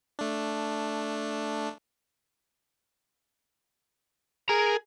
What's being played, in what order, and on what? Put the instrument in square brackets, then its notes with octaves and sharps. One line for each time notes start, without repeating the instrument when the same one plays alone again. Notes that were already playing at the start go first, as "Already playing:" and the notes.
[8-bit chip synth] A3 D4
[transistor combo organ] G#4 [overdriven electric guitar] A#4 A#5